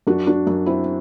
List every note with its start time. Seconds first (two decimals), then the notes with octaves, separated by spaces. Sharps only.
0.07 F#2 D4 F#4
0.27 D4 F#4
0.47 F#2
0.66 C4 E4